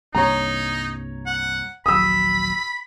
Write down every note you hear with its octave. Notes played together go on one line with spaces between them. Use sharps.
C2 G2 A#3 D#4 C#5 A#5
F#5
D#1 A#1 F#3 B5 D#6 E6